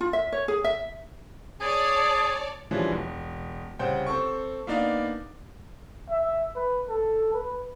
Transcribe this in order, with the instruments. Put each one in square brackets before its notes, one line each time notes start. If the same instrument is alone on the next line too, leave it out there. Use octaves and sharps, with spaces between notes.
[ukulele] F4
E5
C#5
G#4
E5
[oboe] G#4 [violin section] C#5 D5 A5
[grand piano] E3 F3 G3 G#3 C#4 D4
E1
C2 C#3 C5 F#5 G5
C4 A4 C#6
A#3 B3 D4 D#4 D5 F5
[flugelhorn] E5
B4
A4
B4